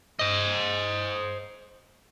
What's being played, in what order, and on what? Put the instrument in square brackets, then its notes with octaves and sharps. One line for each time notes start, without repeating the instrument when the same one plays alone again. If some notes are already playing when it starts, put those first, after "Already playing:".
[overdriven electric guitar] C5 D#5